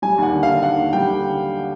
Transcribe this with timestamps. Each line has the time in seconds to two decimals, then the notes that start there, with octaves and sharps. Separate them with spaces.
0.02 G3 G#5
0.18 D#2 F#5
0.33 D3
0.43 F5
0.48 D#2
0.63 D#2 F#5
0.78 D#2
0.93 G3 G5
1.08 D3